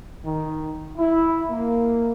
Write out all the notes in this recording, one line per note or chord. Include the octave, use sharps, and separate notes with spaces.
D#3
E4
A#3